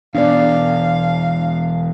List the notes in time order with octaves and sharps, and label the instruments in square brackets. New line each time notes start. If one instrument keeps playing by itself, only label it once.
[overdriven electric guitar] E2 B2 [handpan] D4 D5 [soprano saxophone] F5